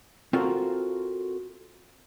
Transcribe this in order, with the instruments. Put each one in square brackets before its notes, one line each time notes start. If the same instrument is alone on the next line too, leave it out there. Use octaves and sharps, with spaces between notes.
[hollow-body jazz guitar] C4 F4 F#4 A4 A#4 C5